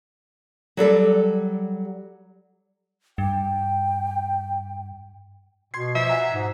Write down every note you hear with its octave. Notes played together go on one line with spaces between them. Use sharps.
F#3 G3 A4 D5
G2 G5
B2 C6 G#6 C7
F3 E5
F#5 G#5 A#5
G#2